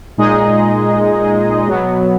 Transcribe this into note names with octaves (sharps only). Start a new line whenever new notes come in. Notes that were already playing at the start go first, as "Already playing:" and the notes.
A#2 G#3 D#4 G#4 D#5
B2 F#3 B3